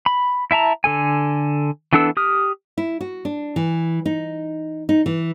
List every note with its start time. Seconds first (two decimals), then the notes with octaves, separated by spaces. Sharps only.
0.06 B5
0.51 E4 E5 A5 A#5
0.84 D3 A4 G#5
1.93 E3 B3 D4 A4 E6
2.17 G4 D#6 F6
2.78 E4
3.01 F#4
3.25 D4
3.56 E3
4.06 D#4
4.89 D#4
5.06 E3